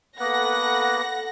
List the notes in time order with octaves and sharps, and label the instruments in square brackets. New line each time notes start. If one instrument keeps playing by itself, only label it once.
[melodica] A#3 B3 B4 [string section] A4 F#5 A#6